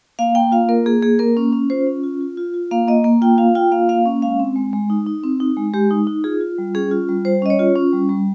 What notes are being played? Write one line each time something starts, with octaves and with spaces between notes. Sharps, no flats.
A#3 F5
A#3 G5
F4 F5
A#3 A#4
A#3 G#4
A#3 G#4
A#3 A#4
C#4
C#4
F4 C5
C#4
F4
F4
F4
F4
A#3 F5
A#3 D#5
A#3
F4 G5
F4 F5
F4 G5
A#3 F5
A#3 F5
C#4
G#3 F5
C4
G#3
G#3
D#4
D#4
C4
D#4
G#3
G#3 G4
D#4
D#4
F4 G#4
F4
G3
C#4 G#4
F4
G3
G3 C5
C#4 D#5
C#5
F4
C#4
G3
G3